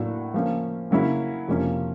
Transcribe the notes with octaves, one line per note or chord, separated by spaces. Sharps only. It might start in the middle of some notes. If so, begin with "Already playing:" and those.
Already playing: A2 F#3 A#3 D4 F#4
F3 A#3 C#4
C#3 F#3 A#3 C#4 E4
F2 C3 F3 A#3 C#4